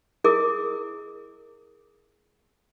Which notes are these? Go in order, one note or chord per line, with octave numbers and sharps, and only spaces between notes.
E4 G#4 A#4 D#5 D6 D#6